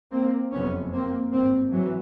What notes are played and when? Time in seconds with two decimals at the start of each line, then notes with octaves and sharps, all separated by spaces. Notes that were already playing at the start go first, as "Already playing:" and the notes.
0.11 A#3 C4
0.52 F#1 F2 C3 B3 C#4
0.92 A#3 C4
1.31 G#1 G2 A#3 C4
1.71 E3 F#3